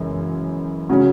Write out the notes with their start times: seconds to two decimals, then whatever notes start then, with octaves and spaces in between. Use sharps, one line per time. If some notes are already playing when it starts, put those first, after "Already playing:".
Already playing: F#2 C#3 E3 G#3
0.89 C#3 F#3 C#4 F#4